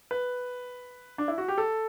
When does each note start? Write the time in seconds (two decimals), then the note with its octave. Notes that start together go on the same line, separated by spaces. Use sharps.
0.11 B4
1.18 D4
1.28 E4
1.38 F#4
1.48 G4
1.58 A4